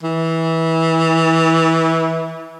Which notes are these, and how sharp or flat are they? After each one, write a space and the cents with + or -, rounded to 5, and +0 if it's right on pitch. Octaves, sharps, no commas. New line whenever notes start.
E3 -20